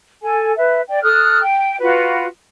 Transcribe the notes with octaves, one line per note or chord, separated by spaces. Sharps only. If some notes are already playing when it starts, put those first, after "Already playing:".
A4 G#5
B4 E5
D5 G5
A4 D#6 F6 F#6
G5
F4 F#4 B4